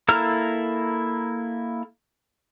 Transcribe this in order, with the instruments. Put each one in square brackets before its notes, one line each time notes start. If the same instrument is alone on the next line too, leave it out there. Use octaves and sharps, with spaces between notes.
[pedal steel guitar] A#3 E4 A4 A#5 F6